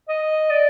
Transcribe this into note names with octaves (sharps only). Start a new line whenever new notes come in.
D#5
D5